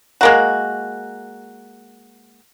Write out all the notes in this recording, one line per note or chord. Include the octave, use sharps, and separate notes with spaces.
G#3 A#3 F#4